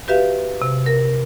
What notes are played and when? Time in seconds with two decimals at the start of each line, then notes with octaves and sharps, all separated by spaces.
0.08 F#4 G4 B4 E5 F5
0.62 C3
0.86 A#4